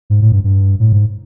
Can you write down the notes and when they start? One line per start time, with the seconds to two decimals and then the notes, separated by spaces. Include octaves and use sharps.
0.10 G#2
0.21 A2
0.32 G2
0.44 G2
0.80 A2
0.93 G#2